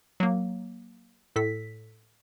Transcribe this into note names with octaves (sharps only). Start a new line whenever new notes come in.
F#3 A#3
A2 A4 B6